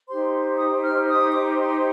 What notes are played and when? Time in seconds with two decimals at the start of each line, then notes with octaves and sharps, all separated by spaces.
0.08 D#4 G4 C5 C6
0.58 D#6
0.83 F6
1.08 D#6
1.32 D6
1.58 C6